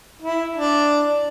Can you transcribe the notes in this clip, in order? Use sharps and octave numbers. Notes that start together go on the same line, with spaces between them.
E4
D4